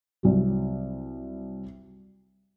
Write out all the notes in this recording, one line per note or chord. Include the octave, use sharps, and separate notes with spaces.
C2 F#3